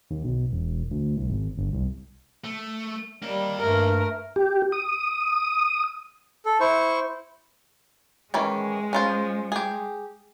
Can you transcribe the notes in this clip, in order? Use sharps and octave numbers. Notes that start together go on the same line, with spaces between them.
D#2
B1
E1
D2
C2
G#1
G1
C2
A3
G3 A#3 D#4
G2 A3 A#4
G4
D#6
A4
E4 C5 C#6
D#3 E3 G#3 C#4
C#4 F4 C5
G4 G#4